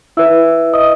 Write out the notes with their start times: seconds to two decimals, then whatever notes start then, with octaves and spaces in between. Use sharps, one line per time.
0.17 E4 B4 E5 E6
0.73 D#5 D#6